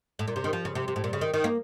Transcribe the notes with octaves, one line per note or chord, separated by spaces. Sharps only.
A2
A#2
C3
D#3
F3
C#3
C3
C3
A2
A#2
C#3
D#3
D#3
A#3